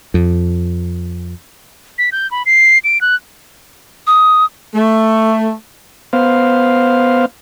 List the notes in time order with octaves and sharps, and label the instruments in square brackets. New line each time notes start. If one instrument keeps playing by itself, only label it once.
[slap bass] F2
[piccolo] B6
G6
B5
C7
D7
F#6
[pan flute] D#6
[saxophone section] A3
[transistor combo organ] B3 C5 F5